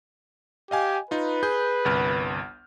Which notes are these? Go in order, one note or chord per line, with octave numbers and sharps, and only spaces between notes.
G4 D#5 F5 G#5
D#4 F4 B4
G#4 G6
G1 C2 F6